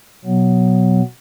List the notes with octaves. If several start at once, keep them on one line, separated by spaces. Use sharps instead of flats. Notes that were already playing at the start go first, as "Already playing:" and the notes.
B2 F#3 B3